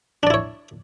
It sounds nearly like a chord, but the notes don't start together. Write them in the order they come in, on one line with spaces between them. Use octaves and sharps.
D4 D5 E4 C#5